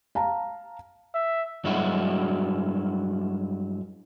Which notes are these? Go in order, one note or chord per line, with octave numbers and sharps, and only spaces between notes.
F5 A5 A#5
E5
G2 F#3 G#3 E4 F#4